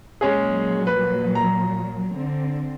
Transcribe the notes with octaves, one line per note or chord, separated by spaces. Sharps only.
A#2 F#3 G#3 C#4 G#4
B4
A#5
D3 C4